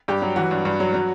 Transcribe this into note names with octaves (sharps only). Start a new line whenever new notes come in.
G2 G4
F#3
E3 F#4
G2
G2
F#3
F#3